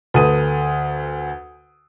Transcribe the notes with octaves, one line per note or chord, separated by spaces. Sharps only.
D2 A4 B4 D#6 D#7